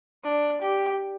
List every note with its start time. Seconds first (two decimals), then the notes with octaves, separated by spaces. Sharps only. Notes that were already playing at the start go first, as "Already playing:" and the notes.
0.24 D4
0.62 G4